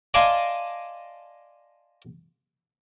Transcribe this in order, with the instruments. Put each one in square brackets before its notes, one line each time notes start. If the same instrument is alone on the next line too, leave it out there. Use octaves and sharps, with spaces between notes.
[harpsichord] D5 D#5 F5 G#5 A5 C6